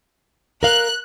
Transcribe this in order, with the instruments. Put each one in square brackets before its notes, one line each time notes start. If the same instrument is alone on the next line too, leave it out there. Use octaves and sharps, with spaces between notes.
[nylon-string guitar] A#4 F5 [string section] F#6